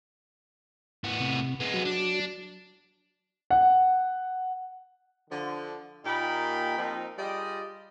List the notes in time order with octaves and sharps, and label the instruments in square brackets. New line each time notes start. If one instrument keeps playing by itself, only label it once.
[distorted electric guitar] A2 B3
[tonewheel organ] C3
[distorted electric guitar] G#3 B3
[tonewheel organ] F#3
[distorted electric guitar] D4
[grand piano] F#5
[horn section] D3 F3
A#2 A#3 D#4 G4 G5 B5
F3 A#3 C4 D#4
G3 F4 G#4 D5 D#5